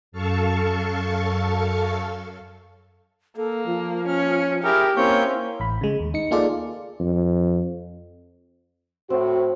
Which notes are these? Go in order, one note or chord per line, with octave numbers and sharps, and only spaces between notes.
F#2 A4 F5 A5 C#6
A#3 A4
F3
C#4 F6
E4 G4 G#4 A#4
A#3 C4 C#4 E4 C#5 G6
A1 B5
C#3 G#3
D#2
D#4 C#7
A#3 D#4 F4 G#4 A4 D5
F2
A2 C4 F#4